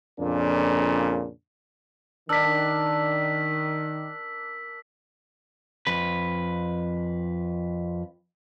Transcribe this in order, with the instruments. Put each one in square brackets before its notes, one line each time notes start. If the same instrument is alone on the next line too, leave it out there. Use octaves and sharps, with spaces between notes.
[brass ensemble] F2 A#2 C#3 A#3 D4
[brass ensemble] D#3 [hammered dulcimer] D4 A#4 [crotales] E6 B6
[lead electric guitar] F2 B4